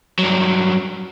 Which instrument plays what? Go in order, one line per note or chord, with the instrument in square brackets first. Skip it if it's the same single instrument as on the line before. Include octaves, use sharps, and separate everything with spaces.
[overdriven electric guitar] G2 F#3